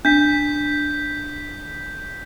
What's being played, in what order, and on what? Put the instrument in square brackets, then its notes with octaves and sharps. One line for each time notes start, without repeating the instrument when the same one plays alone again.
[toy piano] D4 [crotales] G6 B6